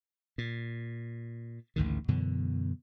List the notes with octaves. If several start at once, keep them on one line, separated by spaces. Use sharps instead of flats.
A#2
A1 D2 G#2 D#3
F#2 B2 D3 E3